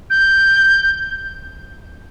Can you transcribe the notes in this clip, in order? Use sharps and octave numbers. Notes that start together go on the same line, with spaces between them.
G6